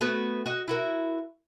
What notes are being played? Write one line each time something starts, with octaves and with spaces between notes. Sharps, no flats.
A3 B3 F#4
F#4 D#5
E4 F#4 A#4